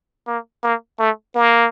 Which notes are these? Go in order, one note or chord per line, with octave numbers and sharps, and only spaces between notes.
A#3
A#3
A3
A#3